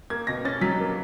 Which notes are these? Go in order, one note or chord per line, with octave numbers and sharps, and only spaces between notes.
A#3 G#6
B2 A#6
C#4 A6
F#3 B6
A#3